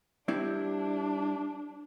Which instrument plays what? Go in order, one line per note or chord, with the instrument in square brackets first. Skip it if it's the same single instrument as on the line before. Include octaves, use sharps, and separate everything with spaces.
[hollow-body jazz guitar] G3 C4 E4 [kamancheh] D4